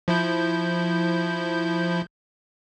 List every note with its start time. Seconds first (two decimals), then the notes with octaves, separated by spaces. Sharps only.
0.08 F3 E4 G6